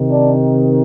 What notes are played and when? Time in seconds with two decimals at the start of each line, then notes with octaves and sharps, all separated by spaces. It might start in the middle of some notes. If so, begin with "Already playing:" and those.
Already playing: C3 D#3
0.10 D4